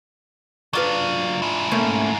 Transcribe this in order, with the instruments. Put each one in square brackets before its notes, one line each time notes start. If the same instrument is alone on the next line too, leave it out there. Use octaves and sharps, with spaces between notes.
[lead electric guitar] F#3 F5 [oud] D4 F4 B4
[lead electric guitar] G#2 E4
[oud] A3 A#3 C#4